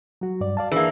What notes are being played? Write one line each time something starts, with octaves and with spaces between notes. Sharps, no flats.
F#3 F#4
G2 D5
D5 F5 A5
E3 A#3 D4 G#4